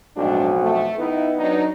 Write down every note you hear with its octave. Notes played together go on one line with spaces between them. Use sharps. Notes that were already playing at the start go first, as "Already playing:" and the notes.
B1 F2 A2 G#3 D4 F#4
A3
D#3 B3 D#4 E4
F#3 D4 D#4